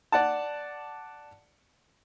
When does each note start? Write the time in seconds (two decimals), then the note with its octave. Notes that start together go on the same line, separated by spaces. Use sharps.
0.12 D5 F#5 A5